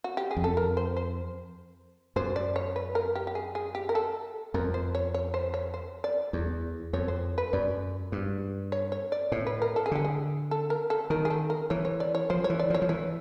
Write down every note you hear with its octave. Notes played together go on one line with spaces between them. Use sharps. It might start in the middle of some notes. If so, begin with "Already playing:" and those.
F#4
G4
G#4
F2
A4
A#4
C5
C5
F#2 C5
D5
C#5
B4
A#4
G4
G4
G#4
G#4
G4
A#4
A4
F2 A#4
C5
C#5
C#5
C5
C#5
C5
D5
E2
F2 C#5
C5
B4
F#2 D5
G2
C#5
C#5
D5
A2 C#5
B4
A#4
A4
G#4
D3 G4
G#4
A4
A#4
A4
D#3 A#4
G#4
A4
A#4
E3 C#5
C#5
D5
C#5
F3 C5
C#5
E3
D5
F3
C#5
F3
E3 C#5